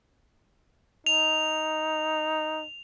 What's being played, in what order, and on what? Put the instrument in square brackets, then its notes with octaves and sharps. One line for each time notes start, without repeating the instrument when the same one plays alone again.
[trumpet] D#4 [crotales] F7